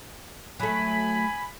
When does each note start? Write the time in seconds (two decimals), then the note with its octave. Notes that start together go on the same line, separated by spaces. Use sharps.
0.60 F#3 A3 G#5 B5